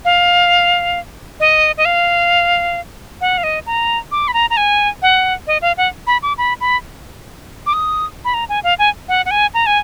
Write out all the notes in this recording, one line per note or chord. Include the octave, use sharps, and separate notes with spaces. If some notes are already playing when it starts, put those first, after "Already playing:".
F5
D#5
D#5
F5
F#5
F5
D#5
A#5
D6
B5
A#5
A#5
G#5
F#5
D#5
F5
F#5
B5
D6
B5
B5
D6
D#6
B5
A#5
G#5
F5
G#5
F#5
F#5
G#5
A#5
G#5